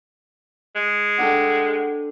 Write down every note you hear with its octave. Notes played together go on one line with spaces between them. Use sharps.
G#3
D4 A4 F#5 G5